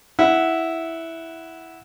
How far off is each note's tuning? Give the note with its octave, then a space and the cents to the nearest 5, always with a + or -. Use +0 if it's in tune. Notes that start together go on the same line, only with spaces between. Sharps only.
E4 -5 F#5 +0